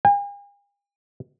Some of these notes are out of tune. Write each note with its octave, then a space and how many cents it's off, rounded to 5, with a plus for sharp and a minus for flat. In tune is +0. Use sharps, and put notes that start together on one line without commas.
G#5 -45